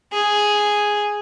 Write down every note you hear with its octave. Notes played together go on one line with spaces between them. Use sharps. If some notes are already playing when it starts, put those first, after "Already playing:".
G#4